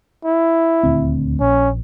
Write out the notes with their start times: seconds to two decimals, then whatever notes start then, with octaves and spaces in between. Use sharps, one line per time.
0.25 E4
0.83 D#1 D2 C4
1.41 A#1 C#4